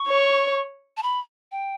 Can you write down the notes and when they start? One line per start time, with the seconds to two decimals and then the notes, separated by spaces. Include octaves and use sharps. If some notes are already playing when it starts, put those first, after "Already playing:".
Already playing: C#6
0.09 C#5
0.97 A5
1.03 B5
1.52 G5